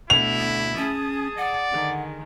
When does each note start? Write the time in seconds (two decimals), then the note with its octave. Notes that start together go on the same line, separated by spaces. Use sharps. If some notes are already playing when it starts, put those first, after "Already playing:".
0.10 D2 B2 D3 E4 F7
0.40 B3
0.77 C#4 G#4 A5 D#6
1.37 D5 F#5
1.71 D3 D#3 G#3